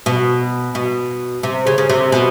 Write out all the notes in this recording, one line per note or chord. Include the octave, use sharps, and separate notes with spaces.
B2
B2
C3
C#3
C#3
C3
B2